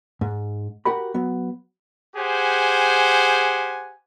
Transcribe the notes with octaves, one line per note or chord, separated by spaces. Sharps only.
G#2
F#4 G4 A#4 B5
F#3 B3
G4 G#4 C5 F#5 G#5